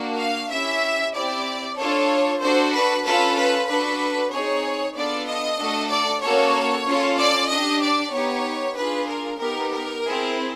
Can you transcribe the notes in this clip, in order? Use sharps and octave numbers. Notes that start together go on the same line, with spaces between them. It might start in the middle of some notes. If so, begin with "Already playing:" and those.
Already playing: A#3 D4 F#4
F5
C#4 E4 G4 E5
C4 E4 G4 D5
D4 F4 A4 C#5
D4 F#4 A4 C5
B4
C#4 F4 A4 B4
B4
D4 F#4 A4 B4
C4 D#4 G#4 C#5
B3 D4 F4 A4 D5
D#5
A3 D4 F#4 A4
D5
A#3 C#4 F#4 A4 C#5
C#4 F4 A4
D5
D4 G4 D#5
D5
B3 D#4 G4 C#5
D4 F4 G#4 B4
A#4
B3 D#4 G4 A#4
A#4
C4 E4 G#4